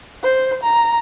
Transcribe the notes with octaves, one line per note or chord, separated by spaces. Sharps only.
C5
A#5